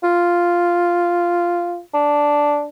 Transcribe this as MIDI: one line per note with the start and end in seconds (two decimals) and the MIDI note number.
0.03 1.79 65
1.94 2.66 62